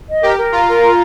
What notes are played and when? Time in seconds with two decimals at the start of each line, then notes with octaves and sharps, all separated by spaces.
0.09 D#5
0.22 G4 A#4
0.38 A#4
0.52 F4 A#5
0.67 A#4
0.82 A#5